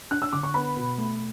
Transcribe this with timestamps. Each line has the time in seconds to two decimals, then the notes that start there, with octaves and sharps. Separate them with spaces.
0.11 D4 F#6
0.22 E6
0.33 D3 D6
0.43 C#6
0.54 B3 B5
0.76 B2
0.98 A3